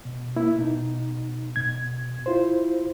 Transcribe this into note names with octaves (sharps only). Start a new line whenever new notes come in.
B2
A#3 E4
B2 D#4
B2 G#6
E4 F4 C5